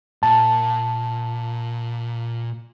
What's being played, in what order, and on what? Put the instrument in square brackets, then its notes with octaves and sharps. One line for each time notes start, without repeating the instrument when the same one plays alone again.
[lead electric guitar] A#2 [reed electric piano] A5